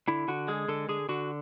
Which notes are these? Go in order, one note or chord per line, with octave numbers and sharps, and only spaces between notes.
D3 E4
D3 F#4
G#3 G#4
D3 A4
D3 G#4
D3 F#4